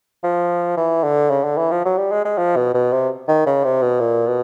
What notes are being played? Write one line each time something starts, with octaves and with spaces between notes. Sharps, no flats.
F3
E3
D3
C#3
D3
E3
F3
F#3
G3
G#3
G#3
F3
B2
B2
C3
D#3
C#3
C3
B2
A#2
B2